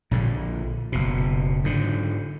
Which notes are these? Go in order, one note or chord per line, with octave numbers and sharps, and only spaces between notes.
A#1 A#2 D3
F#1 B2
G#2 D3